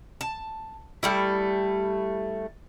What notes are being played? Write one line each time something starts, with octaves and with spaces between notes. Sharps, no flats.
A5
G3 A3 E4